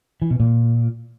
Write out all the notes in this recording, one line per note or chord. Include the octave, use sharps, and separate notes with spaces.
E3
B2
A#2